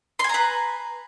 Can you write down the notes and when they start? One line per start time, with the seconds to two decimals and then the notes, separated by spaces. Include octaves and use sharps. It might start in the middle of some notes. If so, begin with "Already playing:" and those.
0.19 C6
0.24 G#5
0.29 A#5
0.34 B4